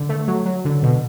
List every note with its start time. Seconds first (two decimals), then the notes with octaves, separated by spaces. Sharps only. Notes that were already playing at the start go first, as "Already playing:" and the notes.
Already playing: D3
0.09 A3
0.28 F#3
0.46 F#3
0.65 D3
0.83 B2